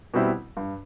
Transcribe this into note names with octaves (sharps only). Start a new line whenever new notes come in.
B2 G3 C4 E4
G2